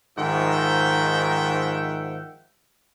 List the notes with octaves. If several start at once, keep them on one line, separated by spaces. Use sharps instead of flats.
G#2 D#3 F3 E5 F#5 G5